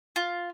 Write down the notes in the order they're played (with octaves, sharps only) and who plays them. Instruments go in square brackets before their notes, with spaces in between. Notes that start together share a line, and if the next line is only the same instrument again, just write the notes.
[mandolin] F4